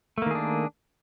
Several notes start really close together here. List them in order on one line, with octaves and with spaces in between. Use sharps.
A3 A#3 D#3 G#4 D4